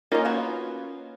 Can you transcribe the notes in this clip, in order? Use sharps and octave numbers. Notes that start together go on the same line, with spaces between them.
A#3 C#4 D#4 F4 D#5
B3 F#4 C#5